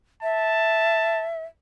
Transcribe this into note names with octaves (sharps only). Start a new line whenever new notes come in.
E5 A5